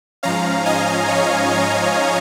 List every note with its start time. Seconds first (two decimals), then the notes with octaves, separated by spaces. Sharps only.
0.23 G#2 F3 C#4 F5 A#5
0.66 D#5 G#5
1.09 C#5
1.51 D#5